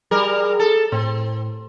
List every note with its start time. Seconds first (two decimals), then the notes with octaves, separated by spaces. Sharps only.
0.11 G3 G#4 A#4
0.59 A4
0.92 A2 C4